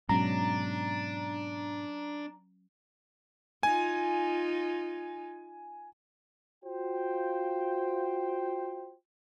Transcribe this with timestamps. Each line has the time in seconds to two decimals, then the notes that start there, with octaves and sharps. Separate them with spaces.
0.09 G#2 B2 F#3 C#4 D4 A#5
3.63 D#4 F4 G#5
6.65 F4 F#4 C5 G5